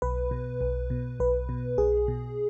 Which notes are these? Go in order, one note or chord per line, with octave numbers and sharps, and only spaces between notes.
B1 B4
B2
B1
B2
B1 B4
B2
B1 G#4
B2